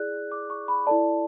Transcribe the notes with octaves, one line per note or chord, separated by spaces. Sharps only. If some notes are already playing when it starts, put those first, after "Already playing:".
Already playing: E4 G#4 D5 F#6
D6
C#6
B5
E4 A4 D5 A5